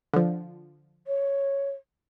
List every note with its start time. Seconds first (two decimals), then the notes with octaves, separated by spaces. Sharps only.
0.13 D3 F3
1.07 C#5